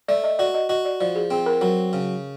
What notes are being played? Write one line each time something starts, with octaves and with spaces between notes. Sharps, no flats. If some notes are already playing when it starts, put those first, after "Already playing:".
A3 D5
D#5
F#4 D5
D#5
F#4 D#5
D5
F3 D5
G#4
C4 G#4
A#4
F#3 A#4
C#3